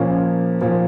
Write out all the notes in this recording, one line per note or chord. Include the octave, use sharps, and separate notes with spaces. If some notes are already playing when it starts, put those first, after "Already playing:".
Already playing: A#2 F3 A#3 C#4
A#2 F3